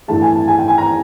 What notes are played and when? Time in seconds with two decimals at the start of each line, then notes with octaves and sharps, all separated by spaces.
0.08 G2 E3 A3 A5
0.22 G#5
0.35 A5
0.48 G#5
0.58 G5
0.68 G#5
0.78 A#5